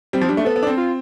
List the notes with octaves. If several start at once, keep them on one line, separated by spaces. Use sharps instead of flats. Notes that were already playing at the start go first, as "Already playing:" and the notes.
G3 C4
F3
G3 D4
A3
B3 A4
B3
D4
C4
F4